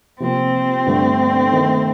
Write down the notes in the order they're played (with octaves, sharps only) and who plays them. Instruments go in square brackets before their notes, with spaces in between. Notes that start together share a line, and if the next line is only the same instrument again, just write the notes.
[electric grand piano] C3 F3 A#3 [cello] C4
[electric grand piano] G2 D3 A3
D#3 A3 D#4